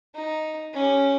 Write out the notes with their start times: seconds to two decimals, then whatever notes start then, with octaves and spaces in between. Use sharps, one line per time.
0.15 D#4
0.74 C#4 G4